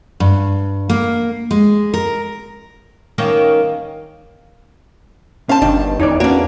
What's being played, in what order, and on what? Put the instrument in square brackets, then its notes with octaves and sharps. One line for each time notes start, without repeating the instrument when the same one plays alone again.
[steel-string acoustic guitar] G2
A#3
G#3
A#4
[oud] D#3 A#3 C#4
[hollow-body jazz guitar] C#4 C5 [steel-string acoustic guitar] F5 A5
[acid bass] G1 [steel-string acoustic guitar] D#3 [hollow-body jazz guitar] D4
[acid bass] E2 [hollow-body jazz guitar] D#4 C#5 D5
[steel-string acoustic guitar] A#3 D4 [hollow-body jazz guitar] C#4 F#4